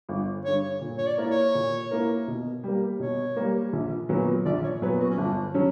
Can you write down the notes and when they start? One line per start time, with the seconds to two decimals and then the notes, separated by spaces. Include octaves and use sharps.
0.09 G1
0.45 G2 D3 C#5
0.81 A#2
0.98 C#5
1.07 D5
1.18 A#3 E4 A#4
1.30 C#5
1.55 A#2
1.91 A#3 E4 A#4
2.28 B2
2.64 G3 A#3
2.99 B2 C#5
3.36 G3 A#3
3.73 A#1
4.09 A#2 F#3 B3
4.45 A#1 D5
4.64 C#5
4.82 A#2 F#3 B3 B4
5.00 F#4
5.10 C#4
5.18 G1 D4
5.54 F#3 C#4